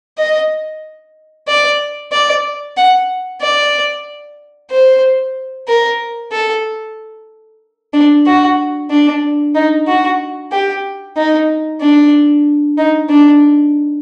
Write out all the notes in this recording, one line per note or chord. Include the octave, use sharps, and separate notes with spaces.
D#5
D5
D5
F#5
D5
C5
A#4
A4
D4
F#4
D4
D#4
F#4
G4
D#4
D4
D#4
D4